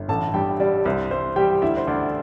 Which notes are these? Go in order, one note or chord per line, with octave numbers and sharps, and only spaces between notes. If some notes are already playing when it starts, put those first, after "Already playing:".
Already playing: G1
A1 A4 A5
G2 G4 G5
G3 D4 D5
C2 C5
C2 C5
G3 G4 G5
D2 E4 E5
C5
D2 D4 D5